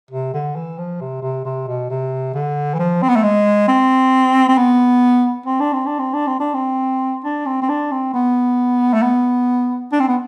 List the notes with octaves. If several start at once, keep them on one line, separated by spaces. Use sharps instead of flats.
C3
D3
E3
F3
C3
C3
C3
B2
C3
D3
E3
F3
C4
B3
A3
G#3
C4
C4
B3
C4
D4
C4
D4
C4
D4
C4
D4
C4
D4
C4
C4
D4
C4
B3
A3
B3
D4
C4
B3